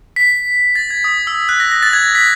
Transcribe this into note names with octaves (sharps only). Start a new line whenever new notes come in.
B6
A6
G#6
D#6
E6
F#6
A#6
A#6
A6
G#6
B6